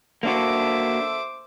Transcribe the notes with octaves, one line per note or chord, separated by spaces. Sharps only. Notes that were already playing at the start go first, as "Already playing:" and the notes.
A#3 D4 F#4 A4 C5 E5 D6